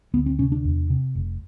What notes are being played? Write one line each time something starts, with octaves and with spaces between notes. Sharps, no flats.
D2 B3
C4
C3 C#4
D4
E2
C3
F1